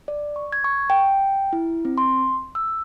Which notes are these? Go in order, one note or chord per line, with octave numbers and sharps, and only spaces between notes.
D5
C#6
G#6
C#6
G5
E4
C4
C6
E6